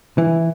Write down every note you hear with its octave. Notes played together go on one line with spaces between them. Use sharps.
E3